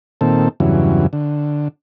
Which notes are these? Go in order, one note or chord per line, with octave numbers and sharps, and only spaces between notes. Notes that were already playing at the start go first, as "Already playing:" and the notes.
A#2 D#3 C4 A4
E2 G2 C#3 E3 F#3
D3